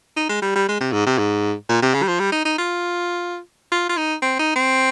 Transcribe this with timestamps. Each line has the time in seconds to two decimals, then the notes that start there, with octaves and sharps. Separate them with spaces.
0.17 D#4
0.29 G#3
0.42 G3
0.56 G3
0.68 G#3
0.80 C3
0.93 G#2
1.06 C3
1.18 G#2
1.69 A#2
1.82 C3
1.94 C#3
2.03 G3
2.08 F3
2.19 G3
2.32 D#4
2.45 D#4
2.58 F4
3.72 F4
3.89 F4
3.97 D#4
4.22 C4
4.39 D#4
4.56 C4